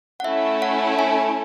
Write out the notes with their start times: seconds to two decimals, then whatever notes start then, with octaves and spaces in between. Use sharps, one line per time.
0.20 F#5
0.24 A3 C#4 E4 E5
0.62 F#5
0.99 G#5